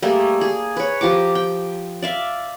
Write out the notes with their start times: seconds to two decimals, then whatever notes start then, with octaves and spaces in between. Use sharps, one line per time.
0.02 G3 A3 A#3 G#4
0.41 G#4
0.77 B4 C#5
1.01 F3 G4 A#5 D6
1.35 G5
2.03 D5 E5 F5